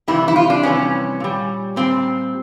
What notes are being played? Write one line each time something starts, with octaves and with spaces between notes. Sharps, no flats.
F2 C3 E3 G3 E4
E4
F4
D4
F2 C3 E3 G3 C#4
A#2 G3
A#2 G3 C4